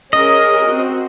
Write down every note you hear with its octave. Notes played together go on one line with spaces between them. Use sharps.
C#4 G#4 A#4 D#5
C4 F#4